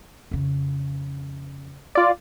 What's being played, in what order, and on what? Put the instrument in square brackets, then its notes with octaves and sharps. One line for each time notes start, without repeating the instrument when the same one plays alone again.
[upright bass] F2 C#3
[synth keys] F4 D5